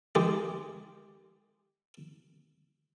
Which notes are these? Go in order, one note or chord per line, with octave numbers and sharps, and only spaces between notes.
D#3 G#3 G4 G#4